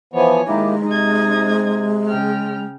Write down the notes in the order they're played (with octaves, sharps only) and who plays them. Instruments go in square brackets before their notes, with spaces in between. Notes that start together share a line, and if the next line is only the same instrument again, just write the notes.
[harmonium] E3 F3 B3 [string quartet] C#5 G#5
[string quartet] D#3 [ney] G#3 [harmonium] A#3 E4 G4
[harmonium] C3 [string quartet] D#4 D#6 G#6
[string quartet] C#3 G5 F6